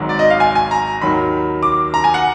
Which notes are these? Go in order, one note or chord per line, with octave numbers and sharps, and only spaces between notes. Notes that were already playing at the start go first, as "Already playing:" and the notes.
Already playing: G#1 G#2 F#3
D5
D#5
F5
G#5
G#5
A#5
D#2 D#3 F#3 B5
D6
A#5
G#5
F#5